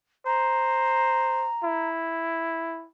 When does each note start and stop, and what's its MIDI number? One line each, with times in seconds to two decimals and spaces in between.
0.26 1.50 72
0.26 1.89 82
1.63 2.88 64